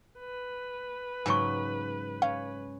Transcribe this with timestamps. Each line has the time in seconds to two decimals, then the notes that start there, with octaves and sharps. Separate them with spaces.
0.20 B4
1.26 G#2 C#3 F#3 G#5 C#6
2.22 C#4 F5